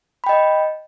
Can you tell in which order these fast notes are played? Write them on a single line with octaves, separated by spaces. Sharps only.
B5 G5 D#5